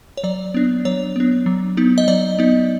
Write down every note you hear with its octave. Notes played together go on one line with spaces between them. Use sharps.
C#5
F#3 D5
B3 D4
F#3 C#5
B3 D4
F#3
B3 D#4
D#5
F#3 D5
B3 D#4